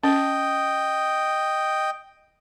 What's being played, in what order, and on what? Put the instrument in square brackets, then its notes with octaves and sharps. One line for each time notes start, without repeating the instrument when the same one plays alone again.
[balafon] C#4 [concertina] D#5 G5